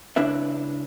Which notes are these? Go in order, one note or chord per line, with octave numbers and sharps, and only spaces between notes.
C#2 D4 E4 B4 E5